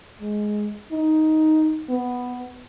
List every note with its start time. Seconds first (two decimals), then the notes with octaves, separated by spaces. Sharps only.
0.21 G#3
0.92 D#4
1.90 B3